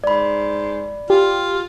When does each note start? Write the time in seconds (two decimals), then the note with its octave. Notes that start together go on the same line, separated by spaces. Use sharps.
0.04 G#2 D5 B5
1.10 F4 G4